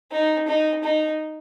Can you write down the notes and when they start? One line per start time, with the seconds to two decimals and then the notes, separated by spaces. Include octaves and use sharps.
0.12 D#4
0.48 D#4
0.84 D#4